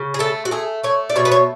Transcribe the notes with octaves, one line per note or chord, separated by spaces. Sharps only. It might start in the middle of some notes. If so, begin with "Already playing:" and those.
Already playing: C#3
G#4
A3 A4
F#4
A3 G#4
A3 C#5
D5
B2 C#5
B4
C#5